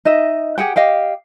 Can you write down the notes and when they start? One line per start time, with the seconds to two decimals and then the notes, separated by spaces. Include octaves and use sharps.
0.05 D#4 D#5 E5
0.58 G4 G#4 F#5 G5
0.76 G4 D#5 F5 G5